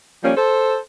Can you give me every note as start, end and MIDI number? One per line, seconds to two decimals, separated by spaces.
0.23 0.32 53
0.23 0.32 55
0.23 0.32 58
0.23 0.32 61
0.37 0.76 69
0.37 0.76 72